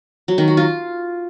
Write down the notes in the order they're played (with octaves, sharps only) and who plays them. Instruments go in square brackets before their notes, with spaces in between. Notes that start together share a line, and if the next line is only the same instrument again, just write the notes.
[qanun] F#3
D#3
F#4
F4